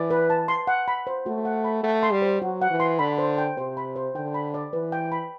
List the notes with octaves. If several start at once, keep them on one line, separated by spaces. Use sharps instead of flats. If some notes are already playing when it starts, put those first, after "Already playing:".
Already playing: E3 D5
B4
A5
C6
F#5
B5
C5
A3 F#4
F#5
B5
A3 F#5
C6
G3
C5
F#3 F#4
F#5
E3
C6
D3 B5
C5
G5
C3 C5
B5
C5
D3 G5
B5
D5
E3 B4
G5
B5